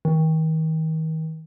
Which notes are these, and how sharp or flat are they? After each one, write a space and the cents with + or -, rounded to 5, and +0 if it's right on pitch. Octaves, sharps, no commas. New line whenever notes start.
D#3 +35